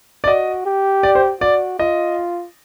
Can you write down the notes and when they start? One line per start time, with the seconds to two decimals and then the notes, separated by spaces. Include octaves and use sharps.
0.24 D5
0.27 F#4 D#5
0.66 G4
1.03 D5
1.15 C5
1.41 F#4 D5
1.79 F4 D#5